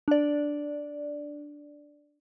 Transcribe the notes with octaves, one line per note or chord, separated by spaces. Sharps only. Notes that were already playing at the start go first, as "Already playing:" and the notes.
D4 D5